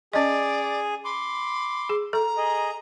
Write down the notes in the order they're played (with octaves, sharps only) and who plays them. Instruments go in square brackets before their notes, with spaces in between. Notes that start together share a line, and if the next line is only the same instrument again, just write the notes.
[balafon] C#4 D#5 [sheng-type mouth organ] G#4 [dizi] D5
[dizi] B5 [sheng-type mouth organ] C6 D6
[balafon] G#4
[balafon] A4 [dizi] A#5
[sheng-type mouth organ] G#4 D#5